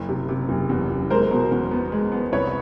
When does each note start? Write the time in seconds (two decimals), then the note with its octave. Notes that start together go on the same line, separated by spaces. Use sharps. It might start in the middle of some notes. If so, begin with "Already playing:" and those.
Already playing: F#1 C#4
0.09 C3
0.29 C3
0.49 F#1
0.69 E2
0.90 F#1
1.10 G#3 A#4 C5
1.31 B2
1.51 E2
1.71 B3
1.92 G#3
2.12 B3
2.32 C2 B4 C#5